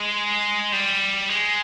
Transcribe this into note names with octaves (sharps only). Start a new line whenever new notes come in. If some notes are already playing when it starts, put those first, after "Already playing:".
Already playing: G#3
G3
G#3